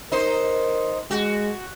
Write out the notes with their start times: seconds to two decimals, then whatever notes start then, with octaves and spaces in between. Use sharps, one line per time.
0.12 D#4 A#4 C5
1.11 G#3 F#4